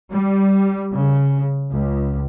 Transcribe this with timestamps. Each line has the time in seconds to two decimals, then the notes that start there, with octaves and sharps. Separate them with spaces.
0.13 G3
0.93 C#3
1.72 C#2